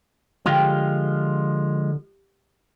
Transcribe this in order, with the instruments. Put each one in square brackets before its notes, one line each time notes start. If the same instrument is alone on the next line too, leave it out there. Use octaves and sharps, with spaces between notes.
[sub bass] D3 [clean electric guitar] F3 G#3 F4 [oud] G4